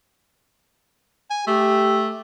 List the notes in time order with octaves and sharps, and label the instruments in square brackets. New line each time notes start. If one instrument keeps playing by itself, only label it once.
[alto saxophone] G#5
[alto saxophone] A3 [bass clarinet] G4